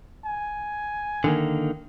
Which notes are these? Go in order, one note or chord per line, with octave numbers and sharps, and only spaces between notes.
G#5
D3 D#3 A#3